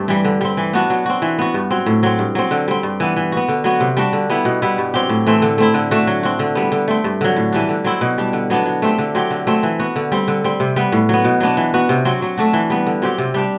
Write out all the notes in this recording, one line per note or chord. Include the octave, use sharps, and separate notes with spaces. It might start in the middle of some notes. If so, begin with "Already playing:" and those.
Already playing: G2 A3 C4
E3 G3
D3
G3 C4
E3
B3 D4 F#4
F#3
C4 F#4
E3
B3 F#4
G2
F#3 C4
A2
F#3 C4
G2
F#3 C4
D3
G3 C4
G2
E3 B3
E3
B3 F#4
D3
F#3 B3 F#4
C3
G3 D4 F#4
D3
G3 B3 E4
B2
G3 B3 E4
G2
F#3 C4 G4
A2
E3 A3 C4
D3
A3 C4 E4
D3
A3 D4 F#4
F#3
C4 F#4
D3
G3 B3
D3
A3 C4
G2
D3 F#3
A2
E3 G3 D4
D3
F#3 C4 E4
B2
G3 D4
D3
F#3 B3 D4
F#3
A3 C4 G4
D3
F#3 C4 G4
D3
F#3 A3 C4
E3
B3 F#4
D3
G3 C4
D3
G3 C4
C3
G3 B3
A2
F#3 B3
B2
F#3 B3 D4
E3
B3 F#4
C3
F#3 C4 F#4
F#3
A3 D4 F#4
E3
G3 B3
D3
F#3 C4 G4
C3
G3 D4 G4